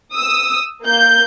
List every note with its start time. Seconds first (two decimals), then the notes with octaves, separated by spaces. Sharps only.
0.15 D#6 E6
0.84 A#3 G6